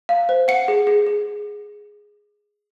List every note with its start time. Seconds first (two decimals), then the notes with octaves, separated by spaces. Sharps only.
0.09 F5
0.29 C5
0.48 F#5 C#7
0.68 G#4
0.87 G#4
1.07 G#4